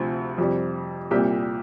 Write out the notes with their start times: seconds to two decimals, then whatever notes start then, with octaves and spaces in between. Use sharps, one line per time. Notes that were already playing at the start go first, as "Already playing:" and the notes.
Already playing: D2 C3 F3
0.38 F2 C3 G3
1.11 C2 A#2 G3 G4